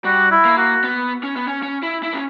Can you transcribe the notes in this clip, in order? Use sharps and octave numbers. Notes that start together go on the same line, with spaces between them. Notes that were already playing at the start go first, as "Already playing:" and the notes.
G3 F#4
E4
A#3
F#4
B3
C#4
B3
C#4
C#4
E4
E4
C#4